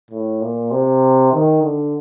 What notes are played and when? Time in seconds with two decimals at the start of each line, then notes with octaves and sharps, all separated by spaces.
0.11 A2
0.42 A#2
0.71 C3
1.33 D#3
1.63 D3